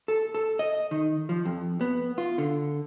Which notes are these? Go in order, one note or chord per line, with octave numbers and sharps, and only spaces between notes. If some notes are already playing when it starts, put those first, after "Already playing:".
A4
A4
D#5
D#3
F3
F2
B3
F4
D3